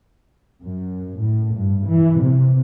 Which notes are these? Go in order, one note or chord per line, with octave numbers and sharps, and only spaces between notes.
F#2
A2
G2
E3
C3